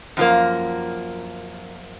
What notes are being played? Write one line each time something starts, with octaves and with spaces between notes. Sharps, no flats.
F#2 F3 A#3